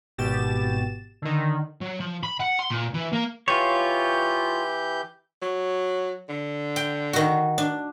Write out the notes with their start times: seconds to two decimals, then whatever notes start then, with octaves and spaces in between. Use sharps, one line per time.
0.18 G#1 B2 G4 A6 E7
1.22 D3 D#3
1.81 F#3
2.00 F3
2.23 B5
2.40 F#5
2.59 C6
2.71 A#2
2.94 E3
3.13 A#3
3.48 E3 F4 G4 C#5 G6
5.42 F#3
6.29 D3
6.76 G5
7.13 D#3 F#4
7.58 D4